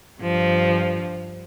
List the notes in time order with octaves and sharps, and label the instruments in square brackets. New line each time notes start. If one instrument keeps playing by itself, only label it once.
[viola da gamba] G2 F3